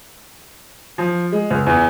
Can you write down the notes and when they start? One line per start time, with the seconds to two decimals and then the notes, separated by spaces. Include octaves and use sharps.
0.98 F3
1.32 G#3
1.50 C#2
1.66 E2